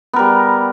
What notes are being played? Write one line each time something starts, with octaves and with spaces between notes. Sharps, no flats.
G3 B3 A#4